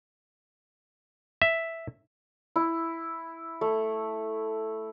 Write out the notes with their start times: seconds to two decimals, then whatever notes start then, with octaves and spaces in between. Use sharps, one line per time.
1.42 E5
2.56 E4
3.61 A3